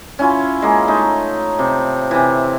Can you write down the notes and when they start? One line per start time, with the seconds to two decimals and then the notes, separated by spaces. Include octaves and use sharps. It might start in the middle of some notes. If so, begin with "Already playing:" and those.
0.19 C#4 E4 F4
0.62 G#3 A#3
0.88 A3 D#4
1.59 C3
2.11 C3 E3